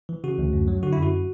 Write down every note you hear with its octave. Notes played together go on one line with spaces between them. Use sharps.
E3
C#3 F#4
D2
F#2
F#3
D3 F#4
E4
F#2
F#4